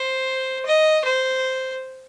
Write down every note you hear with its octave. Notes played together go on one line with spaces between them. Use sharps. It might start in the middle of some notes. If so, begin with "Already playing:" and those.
Already playing: C5
D#5
C5